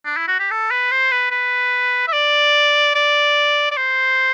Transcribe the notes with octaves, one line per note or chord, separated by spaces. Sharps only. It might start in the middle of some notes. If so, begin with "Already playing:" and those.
D4
E4
F#4
G4
A4
B4
C5
B4
B4
E5
D5
D5
D5
C5